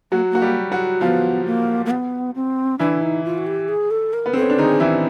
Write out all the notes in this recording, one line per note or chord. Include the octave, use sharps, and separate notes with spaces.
F#3 A#3 F#4
A#3 F#4
G3 G4
F#3 F#4
F3 B3 F4
A#3
A#3
B3
C4
E3 D4 E4
D#4
F4
F#4
G4
G#4
A4
A#4
B3
C4 A4
C#4
D4
D#3 D#4 G#4
E3 E4 G4